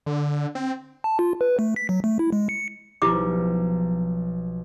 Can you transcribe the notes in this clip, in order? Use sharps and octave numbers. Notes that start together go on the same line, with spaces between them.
D3
C4
A5
F4
B4
A3
B6
F#3
A3
E4
G#3
C#7
B1 F3 E4 G4 D6